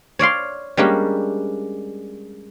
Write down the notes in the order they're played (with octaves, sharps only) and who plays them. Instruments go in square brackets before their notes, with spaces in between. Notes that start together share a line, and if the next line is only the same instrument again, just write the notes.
[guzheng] C#5 D5 F5 C6
G3 G#3 A#3 C#4 D4 G4